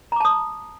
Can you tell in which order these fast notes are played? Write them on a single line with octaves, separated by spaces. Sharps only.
A#5 D6 A5 D#6